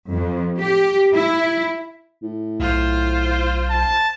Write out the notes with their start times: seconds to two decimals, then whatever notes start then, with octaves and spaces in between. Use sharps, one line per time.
0.11 F2
0.61 G4
1.15 E4
2.23 A2
2.60 B1 F4 C5
3.71 A5